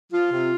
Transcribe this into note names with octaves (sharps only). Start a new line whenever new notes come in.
F3 F4
C3